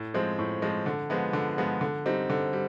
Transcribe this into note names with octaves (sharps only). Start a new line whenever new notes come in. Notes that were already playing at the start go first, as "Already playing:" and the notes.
Already playing: A2
F3 G#3 C4
A2
F3 G#3 C4
D3
F3 G#3 B3
D3
F3 G#3 B3
D3
G3 C4 D#4
D3
G3